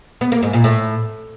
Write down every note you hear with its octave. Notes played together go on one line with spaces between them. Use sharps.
B3
A#3
G#2
A#2
A2